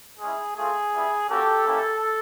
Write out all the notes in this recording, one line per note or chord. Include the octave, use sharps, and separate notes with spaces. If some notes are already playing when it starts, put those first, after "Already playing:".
G#3 C#4 E4 G#4
A3 C4 F4 G#4
G3 B3 E4
A#3 C#4 F#4 G4 A4
A#3 C#4 E4 G4